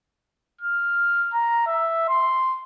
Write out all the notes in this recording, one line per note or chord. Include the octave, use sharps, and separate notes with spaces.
F6
A#5
E5
C6